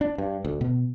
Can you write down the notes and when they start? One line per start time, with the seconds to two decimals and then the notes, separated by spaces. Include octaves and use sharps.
0.01 D4
0.18 G2
0.45 D2
0.61 B2